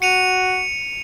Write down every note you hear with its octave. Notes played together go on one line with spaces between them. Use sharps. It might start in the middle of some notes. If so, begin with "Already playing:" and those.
F#4 C#7 D#7 F7